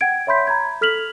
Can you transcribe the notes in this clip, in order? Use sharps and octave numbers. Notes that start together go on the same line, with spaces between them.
F#5 G5 G#6 D7
C#5 E5 B5 C6 G6 B6
A#5 B5 G#6
A4 F6 B6 F7 F#7